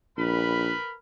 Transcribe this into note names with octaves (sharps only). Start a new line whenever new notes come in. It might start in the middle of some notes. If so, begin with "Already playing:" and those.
A#1 A#4 B4 B5